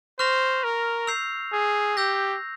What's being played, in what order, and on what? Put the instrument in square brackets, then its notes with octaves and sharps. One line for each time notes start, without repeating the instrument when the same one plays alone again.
[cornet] C5 [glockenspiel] C#6 F6 A#6 F7
[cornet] A#4
[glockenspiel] E6 G6 C7 F7
[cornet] G#4
[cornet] G4 [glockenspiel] E6 G6 A#6